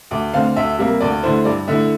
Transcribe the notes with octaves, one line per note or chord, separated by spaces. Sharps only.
D2 D6
D3 A3 C4 F5
D2 E5
C3 G3 A#3
D2 D5
D3 A3 E4 C5
G2 D5
D3 A3 E4 E5